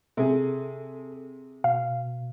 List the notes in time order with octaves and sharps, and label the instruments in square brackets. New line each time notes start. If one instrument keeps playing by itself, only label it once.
[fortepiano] C3 G#4 [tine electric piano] A4
[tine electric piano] B2 [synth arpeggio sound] F5